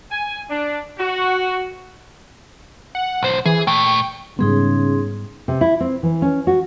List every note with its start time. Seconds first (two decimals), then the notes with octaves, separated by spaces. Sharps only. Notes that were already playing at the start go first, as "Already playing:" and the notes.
0.10 G#5
0.50 D4
0.99 F#4
2.95 F#5
3.23 B1 C5
3.46 E3 G#4
3.67 A#2 A3 G5
4.39 G#2 C#3 G3 B3 D#4 G#4 C6
5.48 C3
5.61 E4
5.80 C4
6.03 E3
6.22 C#4
6.47 F#4